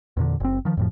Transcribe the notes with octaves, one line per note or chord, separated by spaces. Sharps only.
E2 A#2 D3
F#1 C4
D#3 F3
F2 A2 F3